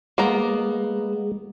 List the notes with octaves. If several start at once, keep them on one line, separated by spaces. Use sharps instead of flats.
G#3 A#3 B3 A#5